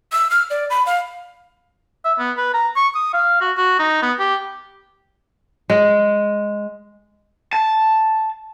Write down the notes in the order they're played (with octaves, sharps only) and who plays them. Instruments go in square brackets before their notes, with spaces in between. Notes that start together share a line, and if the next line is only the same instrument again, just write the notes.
[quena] E6
F6
D5
B5
F5
[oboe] E5
B3
B4
A#5
C#6
D#6
F5
F#4
F#4
D#4
B3
G4
[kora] G#3
[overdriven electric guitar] A5